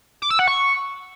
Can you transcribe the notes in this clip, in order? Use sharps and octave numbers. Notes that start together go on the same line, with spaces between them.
D6
E6
F#5
C#6